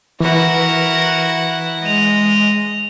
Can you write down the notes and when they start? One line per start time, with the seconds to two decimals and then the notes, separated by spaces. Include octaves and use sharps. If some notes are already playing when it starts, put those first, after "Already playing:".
0.20 E3 E4 F#4 A#4 B4 F#5
1.83 G#3 D#5 F7